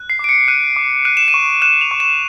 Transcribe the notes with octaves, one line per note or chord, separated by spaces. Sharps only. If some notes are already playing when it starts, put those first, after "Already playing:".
Already playing: F#6
C7
D6 D7
C#7
F#6 D#7
D6
F#6 D#7
E7
D#7
C#6
F#6 E7
F7
C#6
E7